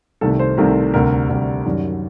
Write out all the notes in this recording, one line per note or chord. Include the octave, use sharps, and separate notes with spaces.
C2 C3 D#3 A3 A4
C5
C2 C3 D#3 A3 A#4
D2 C3 G3 A#4
D2 C3 G3
F#2 D#3 G3